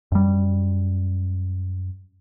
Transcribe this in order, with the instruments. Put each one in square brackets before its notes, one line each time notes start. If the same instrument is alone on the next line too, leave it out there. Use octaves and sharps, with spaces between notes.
[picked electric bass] F#2 G3